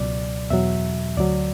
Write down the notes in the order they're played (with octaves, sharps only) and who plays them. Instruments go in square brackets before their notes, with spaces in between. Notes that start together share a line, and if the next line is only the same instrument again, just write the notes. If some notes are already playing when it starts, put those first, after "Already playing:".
Already playing: [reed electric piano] C#2 B2 F#3 D5
E2 B2 F#3 E5
D2 D3 F#3 D5